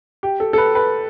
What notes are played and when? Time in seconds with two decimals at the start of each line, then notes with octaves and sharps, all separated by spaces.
0.23 G4
0.40 A4
0.53 A4
0.58 B4
0.75 B4